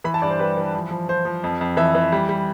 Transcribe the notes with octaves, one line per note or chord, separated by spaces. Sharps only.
E3 B5
A5
G2 D5
C5
G3 B4
E3
F3
F3
F3 C5
F3
F2
F2
E3 E5
E3
G3
G3